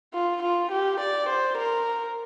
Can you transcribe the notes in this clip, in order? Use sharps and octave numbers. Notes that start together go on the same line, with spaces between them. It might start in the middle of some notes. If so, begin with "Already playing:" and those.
F4
F4
G4
D5
C5
A#4